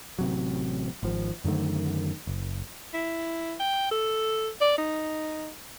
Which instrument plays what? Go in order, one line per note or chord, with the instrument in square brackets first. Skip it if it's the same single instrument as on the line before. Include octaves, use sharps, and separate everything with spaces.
[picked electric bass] A1 C3 F#3
G#1 F3
F#2 D3 D#3 A3
F#1
[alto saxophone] E4
G5
A4
D5
D#4